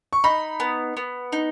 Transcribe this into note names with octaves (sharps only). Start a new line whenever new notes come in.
C#6
D#4 B5
B3
B3
D#4